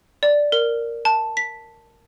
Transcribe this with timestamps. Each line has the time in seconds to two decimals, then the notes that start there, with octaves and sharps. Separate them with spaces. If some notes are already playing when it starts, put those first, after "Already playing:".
0.23 D5
0.52 A#4
1.05 A5
1.37 B6